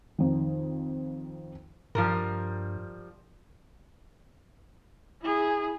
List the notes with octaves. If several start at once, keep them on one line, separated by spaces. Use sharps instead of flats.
F2 D#3
G2 F3 G3 A#4
E4 G#4